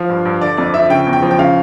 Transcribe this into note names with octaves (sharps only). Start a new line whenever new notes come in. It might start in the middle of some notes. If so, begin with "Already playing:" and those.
Already playing: F3 F5
G2
G2
D3 D5
F2 D5
F3 E5
C#3 G5
E2
G5
F3
G5
C#3 F5